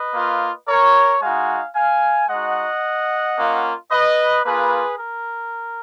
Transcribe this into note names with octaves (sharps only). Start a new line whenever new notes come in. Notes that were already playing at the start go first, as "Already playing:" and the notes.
Already playing: B4 D#5
A#3 F4
A#4 C#5
G#3 D#4 F#4 F5 G#5
F5 G#5
G#3 D#4 F#4 D#5 F#5
A#3 C#4 F4
B4 D#5
A#3 F4 G#4 B4
A#4